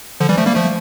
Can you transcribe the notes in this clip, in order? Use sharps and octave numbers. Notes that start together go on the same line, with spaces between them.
D3 F3
E3 G3
F3 A3
G3 A#3
F3 A3